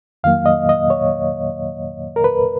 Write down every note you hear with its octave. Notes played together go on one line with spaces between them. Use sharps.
F2 D#3 F#3 A#3 F5
D#5
D#5
C#5
A#4
B4